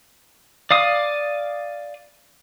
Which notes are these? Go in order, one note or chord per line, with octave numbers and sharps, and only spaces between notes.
D5 F5 D#6